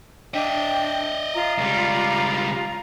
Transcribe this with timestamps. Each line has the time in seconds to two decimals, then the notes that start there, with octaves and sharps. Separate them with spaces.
0.34 D4 D#5 E5 G5
1.34 F4 A#5
1.58 C#2 G3